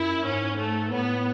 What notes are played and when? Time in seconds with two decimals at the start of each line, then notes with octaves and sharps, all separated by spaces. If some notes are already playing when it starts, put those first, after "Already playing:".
Already playing: F#2 E4
0.25 G#2 C#4
0.58 A3
0.92 A2 B3